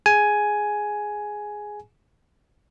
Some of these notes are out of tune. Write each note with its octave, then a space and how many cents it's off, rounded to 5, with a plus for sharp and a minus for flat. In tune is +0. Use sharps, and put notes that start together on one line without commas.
G#4 +0 G#5 +10